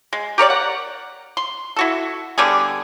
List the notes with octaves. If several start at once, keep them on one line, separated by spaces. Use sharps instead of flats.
G#3
G4 A#4 C#5 D5
F#5
C6
E4 F#4 A4
D3 G3 B3 G#4